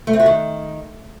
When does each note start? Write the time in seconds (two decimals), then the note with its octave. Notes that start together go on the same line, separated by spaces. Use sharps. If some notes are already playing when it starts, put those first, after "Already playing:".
0.07 A3
0.13 C4
0.20 F#4
0.26 D#3